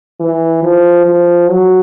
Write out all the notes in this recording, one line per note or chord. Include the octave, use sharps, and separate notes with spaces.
E3
F3
F3
F#3